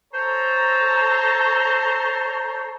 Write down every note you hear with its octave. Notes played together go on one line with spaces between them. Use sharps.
A4 C5 C#5 A5 A#5